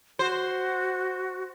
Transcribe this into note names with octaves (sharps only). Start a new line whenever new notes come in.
F#4 C5